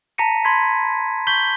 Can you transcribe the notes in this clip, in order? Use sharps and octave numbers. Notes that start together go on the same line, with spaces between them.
A5 A#5 A#6 B6 C#7 D#7
B5 C6 G#6 B6
C#6 G6 B6 F#7 G7